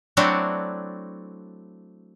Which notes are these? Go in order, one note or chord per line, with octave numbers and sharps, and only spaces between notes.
F#3 A3 C4 D4 E4 F#4